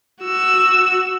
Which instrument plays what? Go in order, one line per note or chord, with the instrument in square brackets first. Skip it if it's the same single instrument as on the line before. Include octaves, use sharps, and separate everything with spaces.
[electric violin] F#4 E6